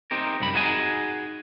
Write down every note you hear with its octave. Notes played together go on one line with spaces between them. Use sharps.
C4 D#4 G4 A#4
C2 F#2 B5
D#4 F#4 G#4 D#5 G#5